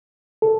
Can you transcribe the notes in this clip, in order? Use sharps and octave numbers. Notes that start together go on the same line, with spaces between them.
A4